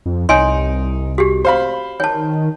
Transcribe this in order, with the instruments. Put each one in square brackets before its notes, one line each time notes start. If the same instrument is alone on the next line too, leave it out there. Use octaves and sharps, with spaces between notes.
[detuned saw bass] F2
[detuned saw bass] C2 [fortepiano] D#4 [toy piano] C#5 G#5 C6
[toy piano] F#4 G4
[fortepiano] C5 F5 B5
[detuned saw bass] D#3 [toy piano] C#5 A5